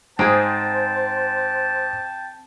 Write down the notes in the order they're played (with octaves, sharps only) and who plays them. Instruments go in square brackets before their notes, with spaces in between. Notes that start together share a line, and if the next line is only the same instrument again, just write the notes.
[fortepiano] G#2 [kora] C4 G#4 [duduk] C5 [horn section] G5 A5